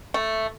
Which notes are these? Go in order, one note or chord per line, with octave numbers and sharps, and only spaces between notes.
A3